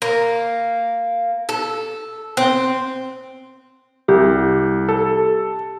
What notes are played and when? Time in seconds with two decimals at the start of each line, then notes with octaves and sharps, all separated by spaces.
0.02 A#3
1.49 A4
2.37 C4
4.08 C2 G4
4.89 A4